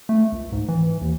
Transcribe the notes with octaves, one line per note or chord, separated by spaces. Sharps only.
A3
C#2
G#2
E3
D#2